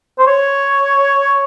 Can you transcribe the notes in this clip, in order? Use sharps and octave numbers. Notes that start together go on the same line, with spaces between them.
C5
C#5